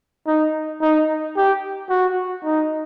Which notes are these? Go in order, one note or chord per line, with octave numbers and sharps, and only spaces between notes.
D#4
D#4
G4
F#4
D#4